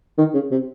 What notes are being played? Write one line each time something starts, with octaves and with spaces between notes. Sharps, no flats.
D#3
C#3
C3